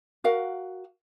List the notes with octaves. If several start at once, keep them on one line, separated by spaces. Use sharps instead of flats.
F#4 A#4 F5 F#5